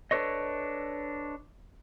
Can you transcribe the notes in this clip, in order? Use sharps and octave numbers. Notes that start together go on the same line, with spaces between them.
D4 A4 B4 C#5 D#5